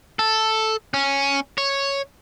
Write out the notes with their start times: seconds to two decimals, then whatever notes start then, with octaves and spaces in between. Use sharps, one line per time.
0.19 A4
0.94 C#4
1.58 C#5